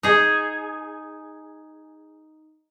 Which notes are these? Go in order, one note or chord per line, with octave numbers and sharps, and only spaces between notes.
D#4 G#4